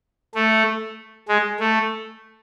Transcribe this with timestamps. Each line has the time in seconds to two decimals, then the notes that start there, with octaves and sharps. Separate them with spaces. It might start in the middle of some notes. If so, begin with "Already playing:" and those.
0.35 A3
1.28 G#3
1.59 A3